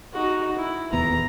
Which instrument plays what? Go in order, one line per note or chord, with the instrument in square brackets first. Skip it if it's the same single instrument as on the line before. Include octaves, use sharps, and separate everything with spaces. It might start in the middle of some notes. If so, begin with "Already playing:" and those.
[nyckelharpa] D#4 F#4
E4
[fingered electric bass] D#1 E2 B3 [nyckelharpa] A#5